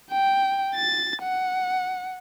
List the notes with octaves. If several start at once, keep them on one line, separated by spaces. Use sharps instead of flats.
G5
A6
F#5